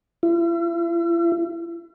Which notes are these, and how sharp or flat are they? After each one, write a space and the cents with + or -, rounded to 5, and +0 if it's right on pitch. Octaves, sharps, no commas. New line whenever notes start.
E4 +45